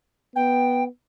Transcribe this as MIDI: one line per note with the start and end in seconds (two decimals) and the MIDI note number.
0.36 0.86 59
0.36 0.84 79